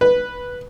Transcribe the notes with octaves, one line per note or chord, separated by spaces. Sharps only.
B4